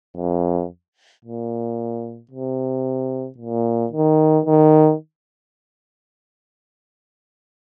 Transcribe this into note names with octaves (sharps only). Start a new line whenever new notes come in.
F2
A#2
C3
A#2
D#3
D#3